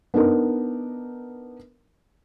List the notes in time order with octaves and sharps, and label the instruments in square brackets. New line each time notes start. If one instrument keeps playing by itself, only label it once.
[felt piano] B3 D4 D#4 A#4